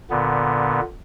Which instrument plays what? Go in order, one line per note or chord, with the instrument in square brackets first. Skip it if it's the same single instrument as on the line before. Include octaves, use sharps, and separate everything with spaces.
[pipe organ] A#2 D3 B3